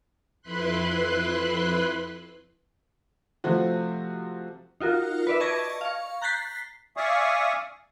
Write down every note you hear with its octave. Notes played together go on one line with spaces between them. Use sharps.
F2 E4 B4 B5 C6 F#6
C3 F3 A3 C4 F#4
D#4 F4 F#4 A#4
B4 D5 E5
D5 D#5 A5 C#6 G#6 A#6
F5 C#6
A#5 F#6 G6 A6 B6 C7
D5 E5 F5 G#5 C#6 D#6